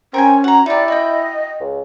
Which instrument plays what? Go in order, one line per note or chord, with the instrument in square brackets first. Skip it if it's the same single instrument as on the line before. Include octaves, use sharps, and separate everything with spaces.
[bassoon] C4 [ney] C#4 [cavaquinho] A#4 G5 G#5
[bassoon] F#4 [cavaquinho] F#5 A#5
[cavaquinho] D#4 G4 [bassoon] E4 [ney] D5
[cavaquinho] F#4 G5 [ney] D#5
[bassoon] C#2